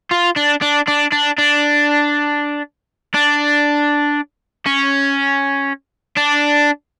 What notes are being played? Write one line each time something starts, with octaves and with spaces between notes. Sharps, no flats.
F4
D4
D4
D4
D4
D4
D4
C#4
D4